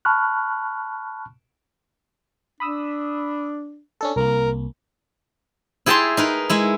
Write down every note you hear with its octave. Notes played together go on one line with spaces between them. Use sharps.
A5 B5 C#6 F6 F#6
D4 B5 D#6 E6
C#4 D4 A4
C2 A#3 A#4
E4 G#4 G5 A5 A#5 C6
D#4 A#4 B4
G#3 E4